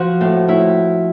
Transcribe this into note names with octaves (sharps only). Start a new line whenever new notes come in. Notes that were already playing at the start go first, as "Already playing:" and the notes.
Already playing: F3 F#4
A2
A2 E4